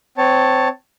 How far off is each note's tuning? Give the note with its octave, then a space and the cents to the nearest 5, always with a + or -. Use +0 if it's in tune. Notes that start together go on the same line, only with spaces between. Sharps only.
C4 -20 C#5 +0 A5 +10